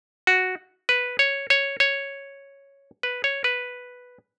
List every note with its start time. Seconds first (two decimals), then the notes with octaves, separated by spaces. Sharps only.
0.27 F#4
0.89 B4
1.19 C#5
1.50 C#5
1.80 C#5
3.03 B4
3.24 C#5
3.44 B4